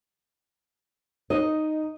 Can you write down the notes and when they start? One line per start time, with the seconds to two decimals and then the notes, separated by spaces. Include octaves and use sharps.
1.30 D#4 D#5